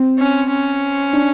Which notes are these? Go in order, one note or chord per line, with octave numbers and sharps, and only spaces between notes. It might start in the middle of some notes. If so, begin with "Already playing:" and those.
Already playing: C4
C#4
C#4
D4